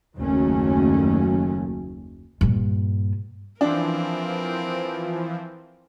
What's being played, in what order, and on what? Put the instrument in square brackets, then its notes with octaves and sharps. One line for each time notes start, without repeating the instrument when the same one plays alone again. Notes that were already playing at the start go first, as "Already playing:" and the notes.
[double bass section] F#1 D#2 F#3 A3 C#4
[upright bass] G2 A#2
[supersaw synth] E3 F3 [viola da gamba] C4 A#4 [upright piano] D4